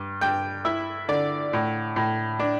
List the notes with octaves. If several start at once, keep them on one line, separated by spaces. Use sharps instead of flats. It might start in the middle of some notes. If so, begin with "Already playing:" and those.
Already playing: G2
G2 G5
E4 E5
D3 D5
A2
A2
D4